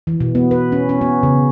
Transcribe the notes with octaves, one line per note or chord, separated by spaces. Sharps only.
E3
B2
B3
B4
C#4
C#4
B3
C#3